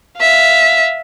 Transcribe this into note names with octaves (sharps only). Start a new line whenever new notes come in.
E5 F5